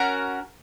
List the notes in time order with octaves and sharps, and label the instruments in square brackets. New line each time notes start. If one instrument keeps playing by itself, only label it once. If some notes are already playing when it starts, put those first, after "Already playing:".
Already playing: [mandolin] C#4 F#4 A#4